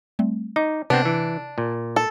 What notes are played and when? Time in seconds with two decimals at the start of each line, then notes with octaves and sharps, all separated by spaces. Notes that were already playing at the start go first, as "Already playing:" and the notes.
0.19 G3 A3 C4
0.56 D#4 D6
0.90 C3 B3 C4 D4
1.05 E3
1.58 A#2
1.96 A4